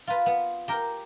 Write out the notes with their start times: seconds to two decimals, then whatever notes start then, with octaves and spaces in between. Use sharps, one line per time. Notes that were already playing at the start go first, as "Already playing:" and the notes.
0.07 F4 B4
0.26 B3
0.68 G4 A#4